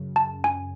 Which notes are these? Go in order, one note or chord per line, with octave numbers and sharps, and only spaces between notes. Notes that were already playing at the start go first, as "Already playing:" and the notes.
Already playing: F#2 C#3
A5
G#5